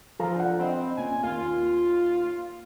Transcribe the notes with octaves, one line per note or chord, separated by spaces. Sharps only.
F3 A4 F5 A#5
D4 F#5
C4 D#5 B5
A#2 C#4 G#5
D#2 F4